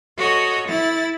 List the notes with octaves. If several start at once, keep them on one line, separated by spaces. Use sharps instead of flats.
F#4 A4 C#5 D#5
E4 A6